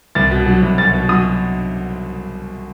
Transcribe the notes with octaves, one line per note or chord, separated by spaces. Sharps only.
C2 A6
B2
F#3
C2
C2 A6
B2
F#3 D#6